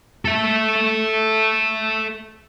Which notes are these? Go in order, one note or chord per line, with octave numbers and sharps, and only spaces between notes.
A4 E5